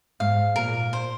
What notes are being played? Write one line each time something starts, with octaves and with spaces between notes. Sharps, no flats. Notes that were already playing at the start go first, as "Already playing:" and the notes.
G#2 F5
A#2 A#4
C5